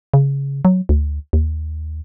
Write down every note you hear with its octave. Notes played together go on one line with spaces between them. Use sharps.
C#3
F#3
D2
D#2